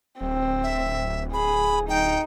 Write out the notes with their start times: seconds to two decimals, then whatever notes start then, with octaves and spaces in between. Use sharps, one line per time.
0.21 D1 C4
0.63 E5
1.33 G#4 B5
1.89 D#4 G5